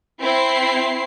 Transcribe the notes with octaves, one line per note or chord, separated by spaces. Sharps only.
C4 E4 C7